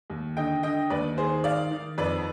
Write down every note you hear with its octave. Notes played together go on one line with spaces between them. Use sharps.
D#2
D3 D#5 G5
D3 D#5 G5
D#2 B4 D5
D#3 G#4 C5
D#3 D5 F5
D#3
F2 B4 D5